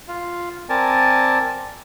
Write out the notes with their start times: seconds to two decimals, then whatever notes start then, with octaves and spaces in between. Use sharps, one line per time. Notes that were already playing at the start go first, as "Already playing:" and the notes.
0.08 F4 F5
0.69 C4 A#4 D5 G#5 A5